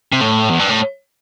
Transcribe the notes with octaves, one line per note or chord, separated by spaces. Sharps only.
C3
A2
E2
G2
A2